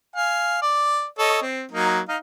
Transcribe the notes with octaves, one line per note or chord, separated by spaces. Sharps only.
F5 G#5
D5
A4 C#5 D#5
C4
F#3 A#3 D#4
D#4 F5